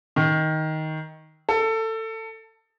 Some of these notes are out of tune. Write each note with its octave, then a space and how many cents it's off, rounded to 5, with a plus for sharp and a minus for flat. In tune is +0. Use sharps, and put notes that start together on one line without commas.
D#3 +10
A4 +20